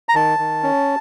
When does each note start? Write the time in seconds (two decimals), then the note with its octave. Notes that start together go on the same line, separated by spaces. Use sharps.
0.09 A#5
0.15 D#3 A5
0.39 D#3
0.63 C#4